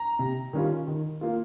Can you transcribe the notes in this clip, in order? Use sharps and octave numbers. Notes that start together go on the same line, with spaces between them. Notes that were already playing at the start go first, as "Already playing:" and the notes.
Already playing: A#5
C3
D#3 G3 C#4 F4
D#3
A#3 F4